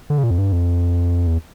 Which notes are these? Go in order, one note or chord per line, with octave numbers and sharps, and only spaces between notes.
D3
C#3
A#2
F2
G2
F2
E2